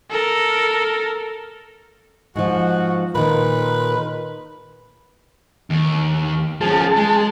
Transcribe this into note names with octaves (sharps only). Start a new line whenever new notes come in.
A4 A#4
G#2 F3 F#4
A#2 D#3 B4
D#2
F3 C#4 G#4 A5
G#3